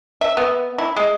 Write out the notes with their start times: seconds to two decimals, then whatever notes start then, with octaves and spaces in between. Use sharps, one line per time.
0.21 E5
0.37 B3
0.78 E4
0.96 G#3